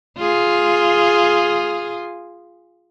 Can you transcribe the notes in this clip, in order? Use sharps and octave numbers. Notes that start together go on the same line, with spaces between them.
F4 G#4